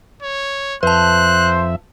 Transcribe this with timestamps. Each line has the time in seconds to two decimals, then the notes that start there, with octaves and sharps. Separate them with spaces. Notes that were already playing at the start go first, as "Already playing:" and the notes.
0.22 C#5
0.83 F2 B4 C5 E5 A5 F#6